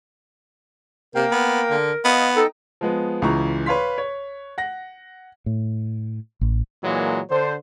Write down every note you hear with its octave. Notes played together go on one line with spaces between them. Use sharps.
C3 A#3 A#4 F5 G5
B3
D3
B3 D#5 F5
D#4 A4 D#5 G5
F3 G#3 B3
C#2 E3 F4 A#5 C#6
B4 C#5 F5 C6 B6
C#5
F#5 A#6
A2
A1
A#2 E3 F#3 G#3 A#3
D3 C5